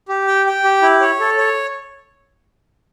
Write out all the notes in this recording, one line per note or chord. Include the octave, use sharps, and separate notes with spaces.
G4
G5
G5
G4
E4
C#5
A4
C#5